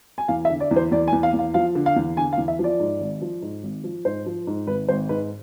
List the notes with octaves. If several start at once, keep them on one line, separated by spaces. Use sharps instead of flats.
G#5
E2 F5
E5
D3
D5
E2
C5
E2 D5
G#5
E2
F5
E2
F5
F3 F5
D3
F5
E2
D3 G#5
F5
E2
E5
F3
D5
G#2
G#1
F3
G#2
G#1
F3
G#2 C5
F3
G#2
G#1 B4
G#1 C5
G#2 B4